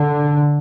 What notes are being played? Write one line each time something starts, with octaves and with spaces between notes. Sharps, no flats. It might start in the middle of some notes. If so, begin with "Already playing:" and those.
Already playing: D3